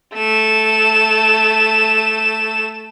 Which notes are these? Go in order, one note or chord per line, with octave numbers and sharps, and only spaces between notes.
A3 E7